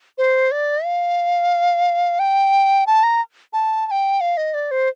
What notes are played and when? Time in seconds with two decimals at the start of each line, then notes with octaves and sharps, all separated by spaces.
0.18 C5
0.51 D5
0.85 F5
2.19 G5
2.87 A5
3.03 A#5
3.53 A5
3.87 A5
3.91 G5
4.21 F5
4.37 D#5
4.54 D5
4.71 C5